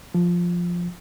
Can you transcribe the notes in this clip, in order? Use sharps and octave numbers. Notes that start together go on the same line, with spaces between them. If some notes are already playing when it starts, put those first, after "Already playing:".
F3